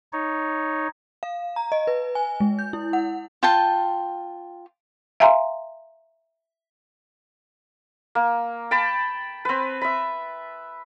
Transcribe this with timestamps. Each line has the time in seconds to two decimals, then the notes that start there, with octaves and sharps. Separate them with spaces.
0.13 D#4 C#5
1.23 F5
1.56 A#5
1.72 D#5
1.87 B4
2.15 G#5
2.40 G#3
2.59 G6
2.73 E4
2.93 F#5
3.43 F4 G5 A5
5.20 E5 F5 G#5 A#5 C6
8.15 A#3
8.71 G5 A5 B5
9.45 C4 B4
9.82 E5 B5